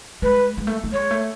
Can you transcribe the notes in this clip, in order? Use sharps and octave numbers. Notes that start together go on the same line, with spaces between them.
G#3 B4
G#3
A3
A3
G#3 C#5
A3